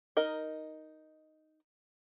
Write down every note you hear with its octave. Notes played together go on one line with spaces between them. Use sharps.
D#4 A#4 D#5